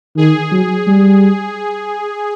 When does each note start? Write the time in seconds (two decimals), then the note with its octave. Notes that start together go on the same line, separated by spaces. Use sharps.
0.16 D#3 G#4
0.51 F#3
0.87 G3